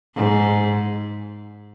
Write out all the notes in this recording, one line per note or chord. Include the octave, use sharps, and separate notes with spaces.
G#2